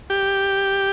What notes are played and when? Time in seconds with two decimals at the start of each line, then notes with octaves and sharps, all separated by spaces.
0.10 G4